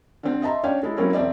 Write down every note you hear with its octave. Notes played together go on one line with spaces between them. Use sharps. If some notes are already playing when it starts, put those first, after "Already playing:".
D3 C4
D#5 E5 A5 A#5 C6
C#4 D4 C#5 D5 F5 G5
G#3 E4 A4
F#3 A#3 C4 C#4 E4 A#4
E1 C4 D5 E5